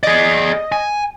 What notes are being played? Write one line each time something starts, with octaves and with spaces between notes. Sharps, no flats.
G#4 D5 D#5
G#5